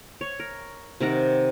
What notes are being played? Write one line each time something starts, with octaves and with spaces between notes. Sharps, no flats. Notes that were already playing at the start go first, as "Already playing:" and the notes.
C#5
A#4
C3 D#3 A#4 F#5